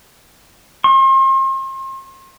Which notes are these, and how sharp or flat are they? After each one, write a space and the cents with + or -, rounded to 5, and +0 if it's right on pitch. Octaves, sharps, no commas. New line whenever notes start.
C6 +40